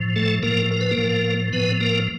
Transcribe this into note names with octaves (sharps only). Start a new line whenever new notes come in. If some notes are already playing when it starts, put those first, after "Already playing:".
Already playing: A2 F3
A3 A4
A2 F3 A#3 A#4
A#4
B4
A#3 A#4
A2 F3
A2 F3 B3 B4
A#3 A#4